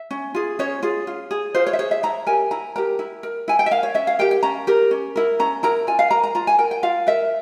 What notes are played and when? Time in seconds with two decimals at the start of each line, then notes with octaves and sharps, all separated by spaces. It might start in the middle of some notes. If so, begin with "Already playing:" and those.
Already playing: E5
0.11 C#4
0.34 F4 G#4
0.59 C#4 C#5
0.83 F4 G#4
1.07 F4
1.31 G#4
1.54 F4 C5
1.66 C#5
1.73 E5
1.79 G#4 C#5
1.91 E5
2.03 E4 A#5
2.26 G4 A#4 G#5
2.51 E4 A#5
2.76 G4 A#4 A#5
2.99 E4
3.23 A#4
3.48 E4 G#5
3.59 G5
3.66 E5
3.71 A#4 F5
3.83 C#5
3.94 C#4 E5
4.07 F5
4.19 G4 A#4 G5
4.31 G5
4.43 C#4 A#5
4.67 G4 A#4
4.91 C#4
5.16 E4 A#4
5.39 C#4 A#5
5.63 E4 A#4 A#5
5.87 F4 G#5
5.99 F5
6.11 A#4 A#5
6.23 A#5
6.35 F4 A#5
6.47 G#5
6.59 A#4 G5
6.71 G5
6.83 F4 F5
7.07 A#4 E5